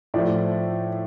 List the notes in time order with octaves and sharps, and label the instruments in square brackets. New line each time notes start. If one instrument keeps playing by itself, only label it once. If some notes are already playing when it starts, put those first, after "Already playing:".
[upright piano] A2 F3 A3 D5